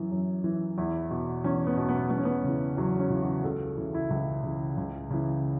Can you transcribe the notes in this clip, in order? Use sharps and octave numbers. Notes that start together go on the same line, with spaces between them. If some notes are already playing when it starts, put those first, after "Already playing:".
Already playing: F#2 E3
F#2
E3
E2 E4
B2
E2 C#4
B3
B2
B3
E2 B3
C#4
B3
C#3 E3
E2 F#3
C#4
C#3 E3
F#4
C#2 A4
C#3 E3 E4
E4
C#2 E4
C#3 E3
C#2
C#3 E3